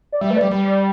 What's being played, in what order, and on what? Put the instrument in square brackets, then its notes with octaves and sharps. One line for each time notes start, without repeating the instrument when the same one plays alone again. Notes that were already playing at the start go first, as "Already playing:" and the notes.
[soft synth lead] D5
[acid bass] G3 [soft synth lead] E5
[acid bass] A3 [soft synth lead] B4
[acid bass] G3 [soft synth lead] D5
[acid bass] G3 [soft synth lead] B4
[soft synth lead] D5